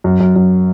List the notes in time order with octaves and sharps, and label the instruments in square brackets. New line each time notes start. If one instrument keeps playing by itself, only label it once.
[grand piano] F#2
F#2
F#2